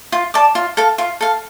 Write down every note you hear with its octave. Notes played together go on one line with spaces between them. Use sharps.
F4
D5 A5 D6
F4
A4 F5
F4
A4 F5